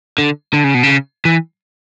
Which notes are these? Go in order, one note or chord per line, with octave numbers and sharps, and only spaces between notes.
D3
D3
C#3
B2
C#3
E3